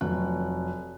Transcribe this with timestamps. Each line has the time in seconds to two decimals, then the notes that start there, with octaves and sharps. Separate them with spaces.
0.01 F1 F#3 F#6